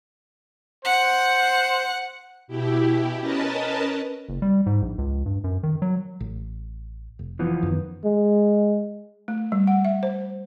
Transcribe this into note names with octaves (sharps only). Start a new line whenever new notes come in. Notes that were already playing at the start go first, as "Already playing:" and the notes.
C5 F#5
B2 E4 G4
C#4 A#4 B4 D#5 A5
F#1
G3
G#2
A#1
C#2
G2
F#2
D#3
F#3
A1
F1
E3 F3 B3
F#2 D#3
G#3
A3
G3
F#5
E5
C5